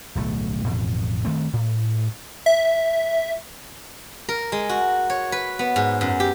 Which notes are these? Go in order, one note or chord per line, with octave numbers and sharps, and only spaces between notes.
D1 B1 A3
A1 F2 B2
D#3 A3 C4
A2
E5
A#4
G#3
F#4
C#5
B4
B3
G#2
F#2
G4